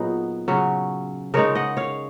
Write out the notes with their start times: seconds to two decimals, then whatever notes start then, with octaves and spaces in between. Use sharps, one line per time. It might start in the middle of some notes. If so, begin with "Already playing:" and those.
Already playing: A#2 F#3 B3 D#4 G#4
0.48 C#3 F#3 C#4
1.34 C#3 G#3 D#4 A#4 C#5
1.55 D#5 F#5
1.77 C#5 F5